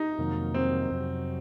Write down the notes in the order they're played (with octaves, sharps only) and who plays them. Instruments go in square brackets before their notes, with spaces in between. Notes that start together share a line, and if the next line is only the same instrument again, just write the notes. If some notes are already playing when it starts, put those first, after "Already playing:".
Already playing: [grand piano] D#4
[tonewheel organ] F2 C3 D#3 F#3 A#3
[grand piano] C4
[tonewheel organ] F2 C3 F#3